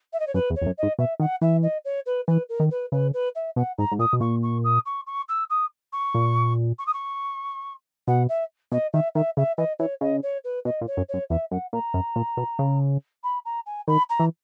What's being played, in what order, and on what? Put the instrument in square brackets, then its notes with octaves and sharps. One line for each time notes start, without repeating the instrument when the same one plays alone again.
[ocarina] E5
D#5
C#5
[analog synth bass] F#2 [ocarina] B4
[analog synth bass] E2
[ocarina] C#5
[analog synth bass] E2
F#2
[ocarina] D#5
[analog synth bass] G#2
[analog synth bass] B2 [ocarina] E5
[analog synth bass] D#3 [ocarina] F#5
[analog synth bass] E3 [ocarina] E5
[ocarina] D#5
C#5
B4
[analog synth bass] E3 [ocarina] B4
[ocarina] A#4
[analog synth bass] D#3
[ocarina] B4
[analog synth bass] C#3 [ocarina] B4
[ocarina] B4
E5
[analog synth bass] B2 [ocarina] F#5
[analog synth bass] G#2 [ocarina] A#5
[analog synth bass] G#2
[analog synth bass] A#2 [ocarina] D#6
[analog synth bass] B2
[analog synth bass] A#2 [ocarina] C#6
[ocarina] C#6
D#6
C#6
C#6
E6
D#6
C#6
[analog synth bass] A#2
[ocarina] C#6
D#6
C#6
[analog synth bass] B2 [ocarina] F#5
[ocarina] E5
[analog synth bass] B2 [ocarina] D#5
[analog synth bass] D#3 [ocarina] E5
[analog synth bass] D#3 [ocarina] E5
[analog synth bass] C#3 [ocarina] E5
[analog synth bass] E3 [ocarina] D#5
[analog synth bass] E3 [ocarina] C#5
[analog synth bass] C#3 [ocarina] D#5
[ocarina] C#5
B4
[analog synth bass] B2 [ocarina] D#5
[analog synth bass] A#2
[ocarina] C#5
[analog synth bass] F#2
[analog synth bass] F#2 [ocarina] C#5
[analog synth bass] E2 [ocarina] E5
[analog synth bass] F#2 [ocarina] F#5
[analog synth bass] A#2 [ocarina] A#5
[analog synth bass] F#2
A#2
B2
C#3
[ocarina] B5
A#5
G#5
[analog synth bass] D#3 [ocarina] B5
[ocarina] A#5
[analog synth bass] E3